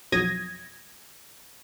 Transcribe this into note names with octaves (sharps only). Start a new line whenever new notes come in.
B1 F2 F#3 D#6 G#6 A#6